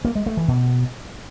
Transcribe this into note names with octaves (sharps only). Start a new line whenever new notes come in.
A#3
G#3
A3
E3
B2